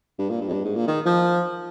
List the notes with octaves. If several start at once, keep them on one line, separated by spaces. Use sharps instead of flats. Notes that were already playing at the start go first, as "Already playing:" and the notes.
G2
A#2
G2
F2
G2
G#2
A#2
D#3
F3